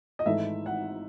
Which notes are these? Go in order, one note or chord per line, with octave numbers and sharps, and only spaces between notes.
D#5
G#1 G#2 E3 A3 E5
F#5